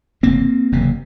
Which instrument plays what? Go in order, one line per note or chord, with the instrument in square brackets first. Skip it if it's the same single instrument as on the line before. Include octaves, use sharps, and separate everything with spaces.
[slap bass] F#1 E2 C3 A#3 C4
F#1 E2 C3